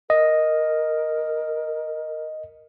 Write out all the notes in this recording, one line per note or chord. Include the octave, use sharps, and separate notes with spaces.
A#4 D#5